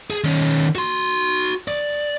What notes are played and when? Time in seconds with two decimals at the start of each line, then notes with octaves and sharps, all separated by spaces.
0.10 G#4
0.24 D#3 C#4
0.75 F#4 C6
1.68 D5